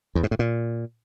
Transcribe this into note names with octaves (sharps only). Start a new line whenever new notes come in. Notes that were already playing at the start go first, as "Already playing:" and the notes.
E2
G#2
A2
A#2